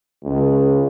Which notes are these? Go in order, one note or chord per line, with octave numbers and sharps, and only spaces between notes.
C#2